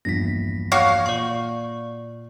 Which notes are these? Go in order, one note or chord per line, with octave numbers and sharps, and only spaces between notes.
A#1 E2 G2 A#6 B6
F#4 C#5 F5
A#2 D5 C#6